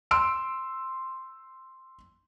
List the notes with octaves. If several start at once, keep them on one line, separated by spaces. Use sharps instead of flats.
C6 E6 D7